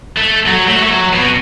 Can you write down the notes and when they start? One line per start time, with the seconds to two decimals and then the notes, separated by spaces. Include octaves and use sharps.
0.18 A3
0.47 F#3
0.68 A3
0.76 F#3
0.83 A3
0.91 F#3
1.13 B2